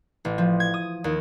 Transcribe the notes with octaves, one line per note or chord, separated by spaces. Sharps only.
A1
F3
G#6
D#6
D#2